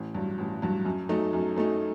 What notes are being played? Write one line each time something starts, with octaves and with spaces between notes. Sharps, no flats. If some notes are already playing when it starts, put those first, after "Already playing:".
Already playing: A1
G2 F#3
A1
G2 F#3
F#2
F#3 A3 D#4
F#2
F#3 A3 D#4